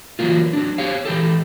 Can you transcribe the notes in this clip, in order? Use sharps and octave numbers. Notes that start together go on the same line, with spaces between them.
E3 F#3 G#3 A#3 F4
F#3 D4
G4 C#5 F5
E3 G4 A4